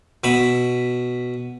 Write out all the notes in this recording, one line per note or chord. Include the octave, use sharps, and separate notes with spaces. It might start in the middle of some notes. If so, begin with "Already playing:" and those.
B2 E5 B5